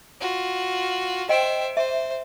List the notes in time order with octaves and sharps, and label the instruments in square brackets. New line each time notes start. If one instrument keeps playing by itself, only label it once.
[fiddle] F4 F#4
[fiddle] C5 E5 [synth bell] D#5 G5 D7
[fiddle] C5 [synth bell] E5